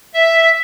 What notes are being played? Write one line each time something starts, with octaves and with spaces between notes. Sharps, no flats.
E5